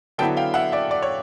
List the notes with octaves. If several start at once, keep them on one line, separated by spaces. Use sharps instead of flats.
D3 F#3 B3 E4 G5 A5
F5 G5
E5 F#5
D5 E5
D5
C#5